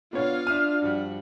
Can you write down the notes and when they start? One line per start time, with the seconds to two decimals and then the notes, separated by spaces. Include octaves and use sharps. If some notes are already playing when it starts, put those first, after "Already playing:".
0.13 B2 B3 D4 F4 C#5 F5
0.47 D4 E5 D6 F6 D#7
0.82 G2 F3 G3 F#4